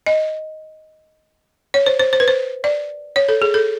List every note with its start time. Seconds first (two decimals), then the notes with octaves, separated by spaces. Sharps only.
0.06 D#5
1.74 C#5
1.86 C5
1.99 C5
2.13 C5
2.20 B4
2.28 C5
2.64 D5
3.16 C#5
3.29 A4
3.42 G#4
3.54 A4